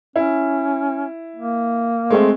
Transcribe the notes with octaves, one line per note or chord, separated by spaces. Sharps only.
C#4 E4
A#3
G#3 A3 C4